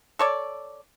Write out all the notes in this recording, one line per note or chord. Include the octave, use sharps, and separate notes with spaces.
A4 C#5 D5